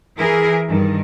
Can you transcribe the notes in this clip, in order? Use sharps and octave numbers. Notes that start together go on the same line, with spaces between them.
E3 E4 G#4 A#4
G2 D#3